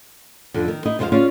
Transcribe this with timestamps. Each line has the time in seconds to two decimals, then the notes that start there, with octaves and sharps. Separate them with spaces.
0.54 F2 D3
0.68 D#3
0.85 D#4 E4 D#5
0.99 F2 G#3 C4 E4 C5 F5
1.12 C#4 F4 G#4 D5 F5